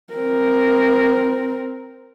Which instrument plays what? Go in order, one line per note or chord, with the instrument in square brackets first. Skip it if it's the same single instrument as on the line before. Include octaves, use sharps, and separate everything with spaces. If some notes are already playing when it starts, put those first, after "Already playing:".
[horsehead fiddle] C4 A#4